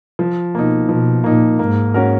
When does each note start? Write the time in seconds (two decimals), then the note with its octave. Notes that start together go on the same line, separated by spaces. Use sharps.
0.19 F3
0.55 B2 A#3 D#4
0.89 B2 F3
1.24 A#2 A#3 D#4
1.59 G#2 A#3
1.94 C#4 F#4 A#4